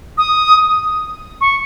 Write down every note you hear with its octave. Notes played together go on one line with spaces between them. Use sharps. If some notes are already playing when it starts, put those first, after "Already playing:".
D#6
C#6